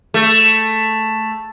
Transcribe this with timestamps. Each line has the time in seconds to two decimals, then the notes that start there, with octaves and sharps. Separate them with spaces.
0.14 A3